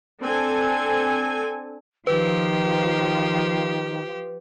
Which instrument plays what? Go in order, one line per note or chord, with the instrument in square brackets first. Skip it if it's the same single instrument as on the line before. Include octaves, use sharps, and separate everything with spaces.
[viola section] C4 D4 A4 G#5
[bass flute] D#3 [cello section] F3 [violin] G4 [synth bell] B4